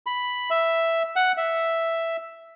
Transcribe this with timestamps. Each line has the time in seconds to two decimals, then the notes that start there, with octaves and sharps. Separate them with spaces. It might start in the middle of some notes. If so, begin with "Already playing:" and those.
0.06 B5
0.50 E5
1.16 F#5
1.37 E5